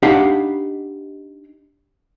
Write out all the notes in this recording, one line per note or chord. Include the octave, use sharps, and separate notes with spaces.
D4 D#4 G4 F5 F#5 B5